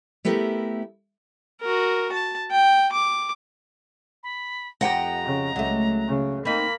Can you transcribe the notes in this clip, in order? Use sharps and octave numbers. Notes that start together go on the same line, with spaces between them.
A3 B3 E4 G4 A#4
F#4 A#4
A5
G5
D6
B5
F2 G4 D#5 F#5 G5 A#5
C#3
C#2 F#3 A3
C#3
A#3 C4 D#4 B5